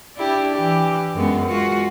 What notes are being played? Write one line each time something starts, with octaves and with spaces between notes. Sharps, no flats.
D4 E4 G4
E3 G4
F#2 G#3 B3
G#3 F4 F#4